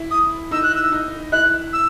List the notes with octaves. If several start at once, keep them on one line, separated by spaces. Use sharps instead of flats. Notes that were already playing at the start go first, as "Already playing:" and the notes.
Already playing: E4
D#6
D#4 E6
F#6
E6
D#4
E4 F#6
E6